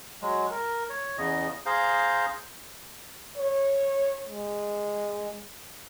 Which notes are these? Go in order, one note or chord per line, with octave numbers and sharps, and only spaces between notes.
F#3 G#3
A#4
C#5
E2 C#3 D#5
G#4 C5 F5 A#5 G6
C#5
G#3